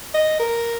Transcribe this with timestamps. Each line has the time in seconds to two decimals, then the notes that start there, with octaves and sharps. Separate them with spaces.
0.14 D#5
0.39 A#4